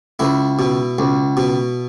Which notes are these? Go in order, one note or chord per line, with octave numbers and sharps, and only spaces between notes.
C#2 E4
B2
C#2
B2